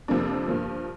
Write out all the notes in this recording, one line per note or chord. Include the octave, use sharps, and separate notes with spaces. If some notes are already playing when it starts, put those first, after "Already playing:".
F2 C3 F3 A#3 D4
G2 F3 A#3